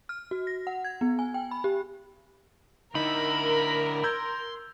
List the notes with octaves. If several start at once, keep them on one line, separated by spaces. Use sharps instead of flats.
F6
F#4
A#6
F#5
G#6
B3
G#5
G5
B5
G4
D3 D#4 E4 A#4 B5
C6 E6 G6 G#6